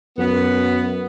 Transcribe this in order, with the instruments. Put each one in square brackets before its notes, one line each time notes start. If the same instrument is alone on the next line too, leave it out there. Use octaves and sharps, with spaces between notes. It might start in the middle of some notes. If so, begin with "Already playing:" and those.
[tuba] F#2 [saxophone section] B3